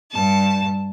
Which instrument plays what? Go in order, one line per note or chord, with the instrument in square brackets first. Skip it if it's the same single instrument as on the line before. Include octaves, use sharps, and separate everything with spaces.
[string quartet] G2 A5